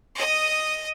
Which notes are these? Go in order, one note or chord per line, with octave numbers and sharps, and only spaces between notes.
D#5 D#6